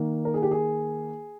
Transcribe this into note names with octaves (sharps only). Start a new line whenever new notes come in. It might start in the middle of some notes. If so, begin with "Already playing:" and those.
Already playing: D#3 A#3
A#4
G#4
G4
G#4